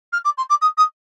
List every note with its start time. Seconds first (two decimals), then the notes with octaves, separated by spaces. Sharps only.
0.12 F6
0.24 D6
0.37 C6
0.49 D6
0.61 D#6
0.77 D#6